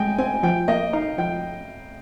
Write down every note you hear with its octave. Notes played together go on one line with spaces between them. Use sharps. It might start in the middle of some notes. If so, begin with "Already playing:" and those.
Already playing: G#3 D#5 G5 G#5
C4 G#5
F3 G5
A#3 D#5
D#4 F5
F3 G5